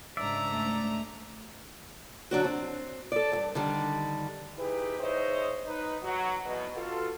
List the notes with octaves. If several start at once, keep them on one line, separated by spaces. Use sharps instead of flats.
G#2 C#3 D4 D5 E5 A#5
A3
D3 F#3 D4 F#4
C4
A4 D5
D2 G2
D3 D#3 G3
D#4 E4 G4 G#4 B4
D#4 G#4 C5 C#5 D#5 E5
D#4 B4
F#3
E2 B2
F4 F#4 A4